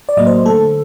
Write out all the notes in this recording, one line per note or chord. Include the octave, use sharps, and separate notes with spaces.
D5
A2 F#3 A#3 D#5
C5
D3 A3 A4